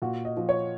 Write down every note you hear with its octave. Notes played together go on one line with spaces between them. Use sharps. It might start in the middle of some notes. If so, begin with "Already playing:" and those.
A#2 F#4
D#5
F3
C#5